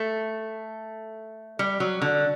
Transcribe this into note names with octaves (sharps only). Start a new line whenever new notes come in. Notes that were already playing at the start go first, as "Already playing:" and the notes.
Already playing: A3
G3
F#3
D3